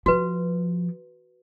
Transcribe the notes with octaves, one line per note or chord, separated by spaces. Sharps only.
F3 F#4 B4